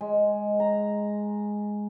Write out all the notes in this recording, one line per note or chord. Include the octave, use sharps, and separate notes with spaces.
G#3
A#5